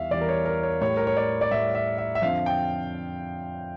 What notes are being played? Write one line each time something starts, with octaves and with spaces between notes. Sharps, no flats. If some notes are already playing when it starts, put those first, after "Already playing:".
Already playing: E2 E3 G3 E5 F5
E2 E3 G3 D5
A#4
C#5
A#4
C#5
A2 G3 C#5
A#4
C#5
D5
D5
A2 G3 E5
E5
E5
E5
F2 D3 F3 F5
G5